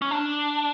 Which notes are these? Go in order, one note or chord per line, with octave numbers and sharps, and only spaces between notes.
C#4
D4